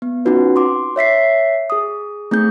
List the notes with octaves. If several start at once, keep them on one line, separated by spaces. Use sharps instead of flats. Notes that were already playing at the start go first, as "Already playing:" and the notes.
B3
C4 C#4 D#4 F4 F#4 B4
C6 D6
C#5 E5 B6 C7
G#4 D#6
A3 C4 D#4 G#4 G6